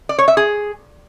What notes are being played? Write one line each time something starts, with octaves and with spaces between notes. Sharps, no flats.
D5
C#5
E5
G#4